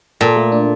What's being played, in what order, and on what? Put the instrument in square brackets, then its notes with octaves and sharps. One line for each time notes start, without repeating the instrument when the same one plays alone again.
[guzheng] A#2 [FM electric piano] A4
[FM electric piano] A3
D4